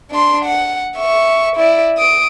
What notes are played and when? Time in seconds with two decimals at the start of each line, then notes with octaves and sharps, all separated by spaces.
0.11 D4 C6
0.45 F#5
0.97 E5 C#6
1.56 E4 D5
1.98 D#6 D7